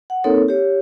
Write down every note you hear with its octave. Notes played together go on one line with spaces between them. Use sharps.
F#5
A#3 C4 D#4 A4 A#4 C#5
G4 C#5